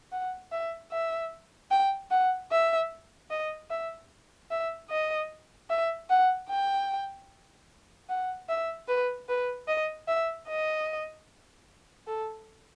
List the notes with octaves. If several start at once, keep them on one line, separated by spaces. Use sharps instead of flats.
F#5
E5
E5
G5
F#5
E5
D#5
E5
E5
D#5
E5
F#5
G5
F#5
E5
B4
B4
D#5
E5
D#5
A4